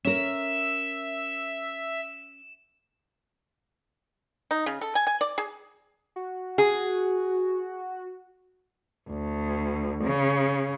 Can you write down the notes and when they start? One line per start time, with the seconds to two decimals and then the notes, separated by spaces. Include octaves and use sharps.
0.05 C#4 A#4 E5 E7
4.51 D#4
4.66 C#3
4.81 A4
4.95 G#5
5.07 G#5
5.21 D5
5.38 G#4
6.16 F#4
6.58 G#4
9.10 D2
10.04 C#3